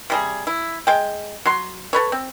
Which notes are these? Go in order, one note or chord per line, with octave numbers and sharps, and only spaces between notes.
C3 G3 G#4
E4
G#3 G5
F#3 C6
A4 B4 C#5
C4